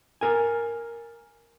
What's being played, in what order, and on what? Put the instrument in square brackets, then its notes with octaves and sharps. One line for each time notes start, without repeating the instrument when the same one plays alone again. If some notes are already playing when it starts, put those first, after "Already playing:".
[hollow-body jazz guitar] A#4 G#5